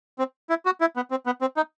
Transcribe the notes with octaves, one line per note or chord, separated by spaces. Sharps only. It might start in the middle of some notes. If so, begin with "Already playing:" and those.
C4
E4
F#4
E4
B3
C4
B3
C4
D#4